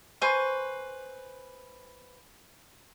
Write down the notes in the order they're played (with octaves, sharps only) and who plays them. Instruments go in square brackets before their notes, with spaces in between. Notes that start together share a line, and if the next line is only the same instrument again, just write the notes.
[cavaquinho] B4 C5 G#5 C#6